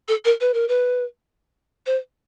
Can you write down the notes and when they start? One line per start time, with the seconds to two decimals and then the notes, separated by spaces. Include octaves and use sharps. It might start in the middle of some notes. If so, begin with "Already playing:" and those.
0.08 A4
0.25 A#4
0.41 B4
0.54 A#4
0.68 B4
1.86 C5